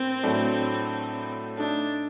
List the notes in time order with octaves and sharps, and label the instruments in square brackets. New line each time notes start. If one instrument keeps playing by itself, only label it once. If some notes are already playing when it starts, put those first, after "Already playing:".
Already playing: [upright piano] A2 A#3 [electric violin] C4
[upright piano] A2 F#3 A3 D4 A4
[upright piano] A3 D#4 A4 [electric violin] D4